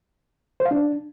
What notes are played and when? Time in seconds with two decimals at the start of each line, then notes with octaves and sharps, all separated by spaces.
0.60 C5
0.65 F5
0.71 D4